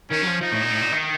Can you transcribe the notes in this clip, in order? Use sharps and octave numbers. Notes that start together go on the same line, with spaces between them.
D#3 C#4
F#3
F3
F3 D#4
A2
A#2
A2
A#2
D#3